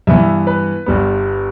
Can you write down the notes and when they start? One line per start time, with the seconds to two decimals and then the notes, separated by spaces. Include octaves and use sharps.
0.07 G2 E3 B3 E5
0.47 B4
0.86 G1 G2 G3 B3